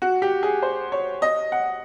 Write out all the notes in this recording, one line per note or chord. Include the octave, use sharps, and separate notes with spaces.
F#4
G4
G#4
C5
C#5
D#5
F#5